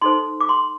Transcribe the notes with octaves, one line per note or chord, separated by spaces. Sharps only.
D#4 A4 C5 C6
D6
C6